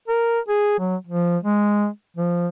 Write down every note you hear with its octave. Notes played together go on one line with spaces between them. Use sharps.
A#4
G#4
F#3
F3
G#3
F3